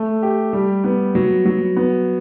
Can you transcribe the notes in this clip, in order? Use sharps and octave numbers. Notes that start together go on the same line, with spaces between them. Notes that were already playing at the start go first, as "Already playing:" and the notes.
Already playing: A3
G4
G3
B3
F#3
F#3
B3